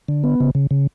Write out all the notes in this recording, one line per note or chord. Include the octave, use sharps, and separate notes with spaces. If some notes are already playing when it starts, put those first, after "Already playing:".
D3
B3
C#3
C#3
C#3